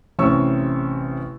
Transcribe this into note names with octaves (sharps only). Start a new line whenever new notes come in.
A1 C3 C#4 C#6 E6